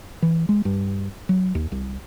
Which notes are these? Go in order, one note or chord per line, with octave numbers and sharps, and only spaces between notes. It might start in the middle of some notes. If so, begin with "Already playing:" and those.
E3
G#3
G2
F#3
D#2
C2